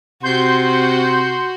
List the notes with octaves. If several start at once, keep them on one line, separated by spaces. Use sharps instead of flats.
C3 F#4 C6 G6